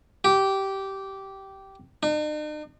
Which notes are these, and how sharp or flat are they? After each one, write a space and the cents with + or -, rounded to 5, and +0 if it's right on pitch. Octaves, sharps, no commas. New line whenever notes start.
G4 -15
D#4 -45